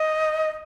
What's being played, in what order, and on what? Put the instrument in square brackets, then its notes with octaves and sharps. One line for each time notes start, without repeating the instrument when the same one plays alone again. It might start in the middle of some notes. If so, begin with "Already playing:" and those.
Already playing: [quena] D#5